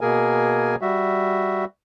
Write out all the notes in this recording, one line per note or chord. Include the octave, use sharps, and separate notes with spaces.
B2 A#3 G#4 A#4 G#5
G3 F#4 E5